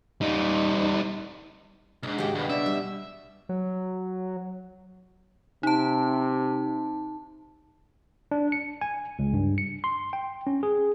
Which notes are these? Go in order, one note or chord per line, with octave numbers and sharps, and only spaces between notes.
G3 D#4
C2 G#2 D4
D#2 C#3 F#4 G4
G2 B2
D4 E5
G3
F#3
C3 D#4 A5
D4
C#7
G#5
C#2
G2
C#7
C6
G5
C#4
G#4